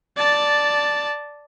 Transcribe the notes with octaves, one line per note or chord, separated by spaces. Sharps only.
D5 A5